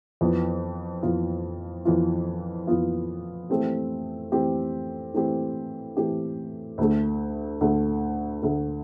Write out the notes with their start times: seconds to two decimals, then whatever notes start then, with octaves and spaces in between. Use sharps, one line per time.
0.21 F2 E3 B3 F4
1.03 F2 E3 B3 F4
1.85 F2 E3 B3 F4
2.67 F2 E3 B3 F4
3.50 E3 A3 C4 G4
4.32 E3 A3 C4 G4
5.14 E3 A3 C4 G4
5.97 E3 A3 C4 G4
6.78 D2 D3 A3
7.61 D2 D3 A3
8.43 D2 D3 A3